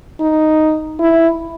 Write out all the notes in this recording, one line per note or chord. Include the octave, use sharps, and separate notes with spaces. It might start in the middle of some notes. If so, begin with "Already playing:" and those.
D#4
E4